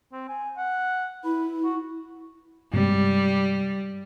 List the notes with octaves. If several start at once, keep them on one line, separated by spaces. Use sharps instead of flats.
C4
G#5
F#5
E4 B4
F#4
G2 C3 G3 G#3